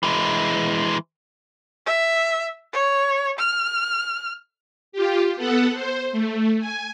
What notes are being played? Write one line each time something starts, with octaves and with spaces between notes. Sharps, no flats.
E3 G#3
E5
C#5
F6
F4 G4
B3 A4 F#5
C5
A3
G#5